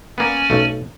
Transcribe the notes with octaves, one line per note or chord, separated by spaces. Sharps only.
A#3 B3 C#4 D5 G#5
B1 A3